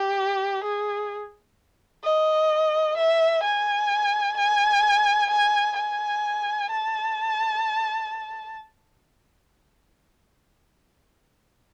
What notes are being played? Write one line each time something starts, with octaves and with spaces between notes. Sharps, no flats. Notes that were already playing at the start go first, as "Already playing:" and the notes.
Already playing: G4
G#4
D#5
E5
G#5
G#5
G#5
G#5
A5